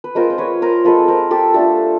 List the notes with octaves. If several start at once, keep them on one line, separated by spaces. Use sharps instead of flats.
B4
G#3 C4 F4 A#4 C5
C5
B4 C#5
A#4 C5
G#3 C4 F4 A4 B4
A#4 C5
G4 A4
A3 D4 F4 G4 A4